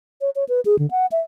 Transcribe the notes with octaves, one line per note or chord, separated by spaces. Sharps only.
C#5
C#5
B4
G#4
D3
F#5
E5